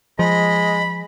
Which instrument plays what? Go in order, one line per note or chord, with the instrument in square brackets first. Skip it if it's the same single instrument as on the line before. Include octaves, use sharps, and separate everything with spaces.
[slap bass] F3 [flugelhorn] G#3 [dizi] D#5 [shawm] B5